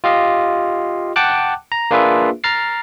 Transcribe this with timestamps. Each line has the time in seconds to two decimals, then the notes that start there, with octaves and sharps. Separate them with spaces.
0.04 F4 G4 D#5 F5
1.16 F#5 G5 A5 D6 F#6
1.72 A#5
1.91 A#3 D4 F4 G#4 B4 E5
2.44 A#5 F6 A6 C7